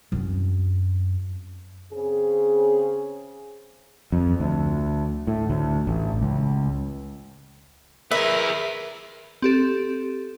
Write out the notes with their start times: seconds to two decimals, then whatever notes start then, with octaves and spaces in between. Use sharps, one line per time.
0.12 F#2 C4
1.92 C#3 C4 G#4
4.12 F2
4.40 D2
5.27 A2
5.50 D2
5.87 A1
6.21 C#2
8.11 G#4 A#4 B4 E5
9.42 C4 G4 A4